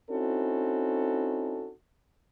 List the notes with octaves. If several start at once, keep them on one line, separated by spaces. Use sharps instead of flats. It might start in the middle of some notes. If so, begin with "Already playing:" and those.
C4 C#4 D#4 E4 F#4 A4